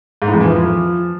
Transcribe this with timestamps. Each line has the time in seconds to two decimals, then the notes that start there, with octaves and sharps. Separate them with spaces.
0.22 G#2
0.28 A2
0.34 F2
0.40 E3
0.47 F3